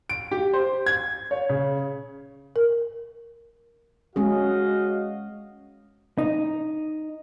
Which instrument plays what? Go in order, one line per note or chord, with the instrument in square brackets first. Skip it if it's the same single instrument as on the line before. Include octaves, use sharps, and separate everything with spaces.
[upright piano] D7
G4
C5
G#6
C#5
C#3
[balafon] A#4
[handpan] G#3 C#4 G#4 [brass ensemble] F#4 D#5 F5
[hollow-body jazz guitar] D#4